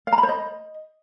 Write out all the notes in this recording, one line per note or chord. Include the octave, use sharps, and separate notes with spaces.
F5
A#5
B5
C5
D#5